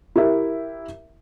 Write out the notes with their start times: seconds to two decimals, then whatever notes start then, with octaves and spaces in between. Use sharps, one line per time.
0.16 E4 G4 A#4 E5